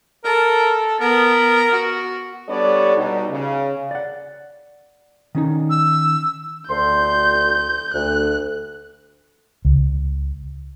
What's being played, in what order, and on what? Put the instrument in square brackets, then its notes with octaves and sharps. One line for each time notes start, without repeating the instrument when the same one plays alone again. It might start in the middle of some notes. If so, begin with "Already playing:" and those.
[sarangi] A4 [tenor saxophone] A#4
[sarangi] B3 [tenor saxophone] A#4
[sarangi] F#4
[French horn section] G3 B3 D4 A4 C#5 D5
B2 G3 D#4
C#3
[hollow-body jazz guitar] D5 F#5
D#3 C#4 D#4
[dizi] E6
[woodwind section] D2 C6 [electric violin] G6
[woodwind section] D2 [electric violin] F#6
[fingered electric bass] C#2